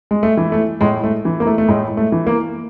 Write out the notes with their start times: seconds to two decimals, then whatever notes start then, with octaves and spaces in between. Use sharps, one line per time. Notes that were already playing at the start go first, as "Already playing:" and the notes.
0.11 G#3
0.23 A3
0.37 E3
0.52 A3
0.81 A2 G#3
1.04 A3
1.25 E3
1.40 A#3
1.47 A3
1.58 A3
1.68 A2 G#3
1.97 A3
2.12 E3
2.27 A#3